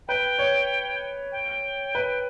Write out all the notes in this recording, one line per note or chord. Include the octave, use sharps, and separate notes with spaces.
B4 G5
C#5
G5
B4